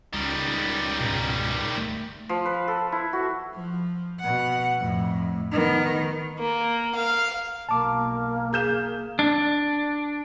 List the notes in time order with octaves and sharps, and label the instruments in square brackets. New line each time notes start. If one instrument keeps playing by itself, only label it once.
[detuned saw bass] C#2 [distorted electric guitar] D#3 G3
[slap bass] G#2 B2
A3
[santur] F3
B4
A4
E4
F#4
[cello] F3
B2 F#5
F2 A2
D#3 B3
[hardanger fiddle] A#3
F5
[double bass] B1 [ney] A#3 [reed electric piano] A5 D6
[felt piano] G#4 G6 E7
[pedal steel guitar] D4